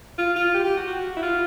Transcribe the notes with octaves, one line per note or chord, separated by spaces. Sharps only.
F4
F4
G4
G4
F#4
F#4
E4
F4